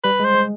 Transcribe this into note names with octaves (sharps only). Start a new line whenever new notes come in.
G3 B4
G#3
C5
G#3